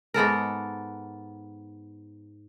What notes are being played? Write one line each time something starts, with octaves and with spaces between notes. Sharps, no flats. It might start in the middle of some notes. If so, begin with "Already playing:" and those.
G#2 B3 A4 A#4